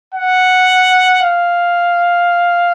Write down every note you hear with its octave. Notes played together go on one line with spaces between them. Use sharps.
F#5
F5